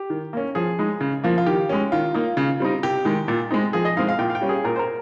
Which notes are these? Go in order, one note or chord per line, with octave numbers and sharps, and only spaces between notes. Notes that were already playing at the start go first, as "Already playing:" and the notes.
Already playing: G4
D#3
A#3 C#4
F3 G#4
G#3 D#4
C#3
F3 A#3
F4
D#3 G4
G#3 C#4
D#3 F4
A#3 D#4
C#3
G3 C4 D#4
C3 G4
D#3 G#3
A#2
G#3 C4 D#4
F3 G#4
D#5
G#3 C4 D#4 F5
F5
A#2 G5
F5
G5
G3 C#4
G#4
A#2 A#4
C5
A#4